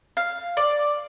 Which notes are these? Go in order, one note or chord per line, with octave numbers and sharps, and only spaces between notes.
F5
D5